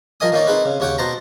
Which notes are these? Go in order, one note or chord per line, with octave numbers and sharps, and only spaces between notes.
F3 A#4 D#5 G#5 D#6
D#3 A#3 D#4 C#5 D5
C4 D#4 G#4 B4
C#3
D#2 C#3 C#5 F#5 G5
B2 C5 A5 A#5